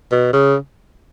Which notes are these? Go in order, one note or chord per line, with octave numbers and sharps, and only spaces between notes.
B2
C#3